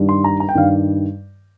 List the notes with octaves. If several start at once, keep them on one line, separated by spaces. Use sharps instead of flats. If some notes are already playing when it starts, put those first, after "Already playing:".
Already playing: G2 D#3 G3
C6
A#5
A#5
G5
G2 D#3 G3 F5